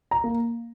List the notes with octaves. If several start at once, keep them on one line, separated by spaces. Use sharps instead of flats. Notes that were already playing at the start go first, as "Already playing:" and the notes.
A#5
A#3